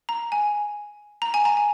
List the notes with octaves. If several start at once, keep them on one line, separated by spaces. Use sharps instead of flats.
A#5
G#5
A#5
G#5
A#5
G#5